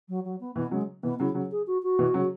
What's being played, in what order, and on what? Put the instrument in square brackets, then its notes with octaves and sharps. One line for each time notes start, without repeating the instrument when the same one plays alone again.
[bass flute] F#3
F#3
B3
[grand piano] B2 E3 [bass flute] B3
[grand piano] C#3 F#3 [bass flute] G#3
[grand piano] B2 E3 [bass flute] B3
[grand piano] C#3 F#3 [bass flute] E4
[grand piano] C#3 F#3
[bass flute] G#4
F#4
F#4
[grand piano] B2 E3
C#3 F#3